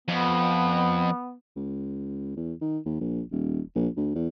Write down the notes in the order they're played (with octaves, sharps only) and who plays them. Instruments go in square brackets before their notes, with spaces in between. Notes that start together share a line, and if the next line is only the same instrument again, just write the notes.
[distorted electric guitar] F2 [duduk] B3
[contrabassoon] C#2
E2
D#3
D#2
A#1
D#1
A#1
D2
E2